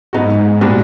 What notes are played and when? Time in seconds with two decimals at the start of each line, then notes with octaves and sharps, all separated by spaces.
0.13 G#2 F#3 B3 D#4 F#4
0.61 A#2 G3 B3 D4 F#4